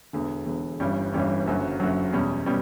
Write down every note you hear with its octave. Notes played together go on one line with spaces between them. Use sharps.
E1 E2 D3
E1 E2 D3
G1 G2 E3 G3 C#4
G1 G2 E3 G3 C#4
F#1 F#2 D3 F#3
F#1 F#2 D3 F#3
E2 B2 G3 C#4
B2 G3 C#4